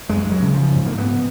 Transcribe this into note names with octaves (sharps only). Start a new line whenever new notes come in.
F#2 G#3
F#3
C#3
F3
G#2
A#3
B3